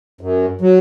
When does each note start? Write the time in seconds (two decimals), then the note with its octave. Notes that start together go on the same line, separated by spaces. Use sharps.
0.21 F#2
0.61 F#3